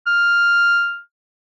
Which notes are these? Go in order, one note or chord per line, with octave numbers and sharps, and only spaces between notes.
F6